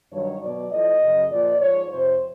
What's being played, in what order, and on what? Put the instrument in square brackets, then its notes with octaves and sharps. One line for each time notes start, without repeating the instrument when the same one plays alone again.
[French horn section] G2 D#3 F#3 C#5
B2 F#3 D5
A2 F3 D#5
F#2 C#3 F#3
A#2 F3 D5
G#2 F3 C#5
F2 C3 F3 C5